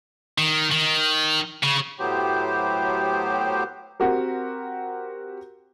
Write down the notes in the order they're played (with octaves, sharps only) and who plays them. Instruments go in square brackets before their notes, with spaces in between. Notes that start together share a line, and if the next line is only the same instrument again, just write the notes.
[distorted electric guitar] D#3
D#3
C#3
[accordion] A2 F#3 B3 G4 C5
[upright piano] C4 F#4 G4 A#4